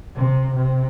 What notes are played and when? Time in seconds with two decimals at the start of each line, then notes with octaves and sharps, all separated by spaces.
0.16 C3
0.56 C3